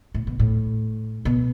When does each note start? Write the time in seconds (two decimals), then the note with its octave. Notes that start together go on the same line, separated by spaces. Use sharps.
0.14 A2
0.27 B2
0.39 A2
1.25 B2